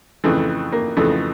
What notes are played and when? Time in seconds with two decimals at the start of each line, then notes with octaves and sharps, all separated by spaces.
0.24 F2 C#3 E3 A3
0.72 A#3
0.97 F2 C#3 E3 A3